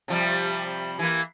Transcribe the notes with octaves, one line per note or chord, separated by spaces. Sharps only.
C3 F3 G3
E3 A#3